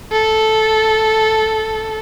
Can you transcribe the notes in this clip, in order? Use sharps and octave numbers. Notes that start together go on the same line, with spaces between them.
A4